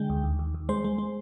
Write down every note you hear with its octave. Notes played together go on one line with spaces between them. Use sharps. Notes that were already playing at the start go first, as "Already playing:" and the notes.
Already playing: D3 G#3 G5
D2
D#2
D#2
D#2
G#3 C5
G#3
G#3